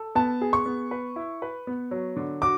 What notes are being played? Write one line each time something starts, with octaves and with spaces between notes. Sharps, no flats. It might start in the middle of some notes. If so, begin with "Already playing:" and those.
Already playing: A4
B3 A5
G#4
C#6
B3
B4
E4
B4
B3
F#3
D3
F#4 D6